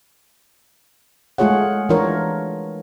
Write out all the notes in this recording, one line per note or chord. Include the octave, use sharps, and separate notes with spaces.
G#3 A3 F4 G#4 C#5 F#5
E3 D4 F4 A#4 C#5